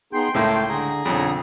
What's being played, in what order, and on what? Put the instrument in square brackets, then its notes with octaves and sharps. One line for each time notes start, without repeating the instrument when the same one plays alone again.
[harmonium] B3 D#4 G#4 [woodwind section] G5 C6
[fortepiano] C#2 A2 A#3 [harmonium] A3 A5
[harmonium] D3 [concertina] G#4 A#5
[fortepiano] B1 F2 [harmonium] D3 [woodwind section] G3 F4 C#5